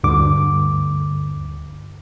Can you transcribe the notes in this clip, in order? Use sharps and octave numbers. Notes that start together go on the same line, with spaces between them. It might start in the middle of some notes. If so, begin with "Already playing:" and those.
D2 G2 D3 D6